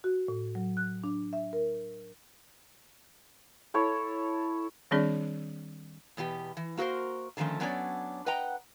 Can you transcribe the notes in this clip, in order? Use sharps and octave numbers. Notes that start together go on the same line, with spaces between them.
F#4
A2
F#3
F#6
D4
E5
A#4
E4 A4 C#5
D#3 G3 C4 D4 G#4 D5
E2 B2 B3 G4
E3
A#3 F#4 A4 A#4 C5
D3 D#3 F3 A3 C#4
F#3 B3 C#4 D4 C#5 D5
B4 D#5 F#5 G5 A#5